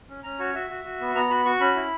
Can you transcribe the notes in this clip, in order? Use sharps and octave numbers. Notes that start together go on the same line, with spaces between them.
C#4
C#4 A#5
F#4 C#5
F#4 E5
F#4
F#4
B3
B3 A#5
F#4 B5
F#4 C#6
C#4 B5
E4